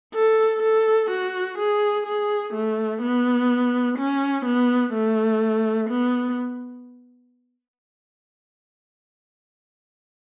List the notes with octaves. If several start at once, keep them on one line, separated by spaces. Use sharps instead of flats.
A4
A4
F#4
G#4
G#4
A3
B3
C#4
B3
A3
B3